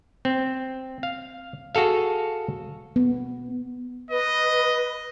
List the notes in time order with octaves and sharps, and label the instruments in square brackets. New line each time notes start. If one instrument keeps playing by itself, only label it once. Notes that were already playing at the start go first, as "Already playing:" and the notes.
[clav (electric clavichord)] C4
F5
F#4 G#4 A4 F5
[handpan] B3
[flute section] B4 [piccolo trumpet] D#5